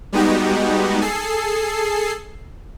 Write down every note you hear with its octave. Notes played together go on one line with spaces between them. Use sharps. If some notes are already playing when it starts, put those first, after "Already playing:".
G3 G#3 B3 D#4 F#4 G4
G#4 A4 C7